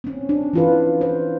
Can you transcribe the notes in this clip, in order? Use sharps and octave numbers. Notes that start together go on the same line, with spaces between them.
C4 C#4
D4
E3 F4 B4
C5